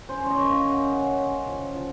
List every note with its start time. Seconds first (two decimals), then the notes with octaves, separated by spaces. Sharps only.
0.09 C#4 C5
0.26 C#5 D#5
0.37 F#2 D#5
0.50 F5
0.65 C#4
0.72 F#5
0.92 C#3 F#5
1.20 C#3
1.47 F3
1.75 F3